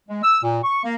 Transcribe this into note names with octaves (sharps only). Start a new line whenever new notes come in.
G#3
E6
A#2
C#6
A#3